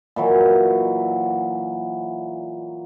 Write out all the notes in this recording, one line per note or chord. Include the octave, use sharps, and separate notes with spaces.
A#2 E3 F#3